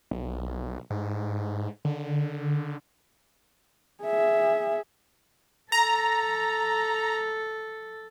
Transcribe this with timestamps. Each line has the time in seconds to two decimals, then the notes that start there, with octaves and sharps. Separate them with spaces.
0.11 B1
0.90 G#2
1.85 D3
4.04 G#4 E5
5.72 A4 A#5